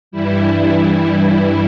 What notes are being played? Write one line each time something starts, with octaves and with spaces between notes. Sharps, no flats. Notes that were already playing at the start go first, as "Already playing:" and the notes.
G2 E3 G3 E4